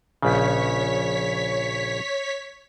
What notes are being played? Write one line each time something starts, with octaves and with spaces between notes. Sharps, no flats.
A#1 C#3 C#5 B6